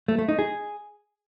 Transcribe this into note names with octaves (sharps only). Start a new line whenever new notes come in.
A3
A3
D#4
G#4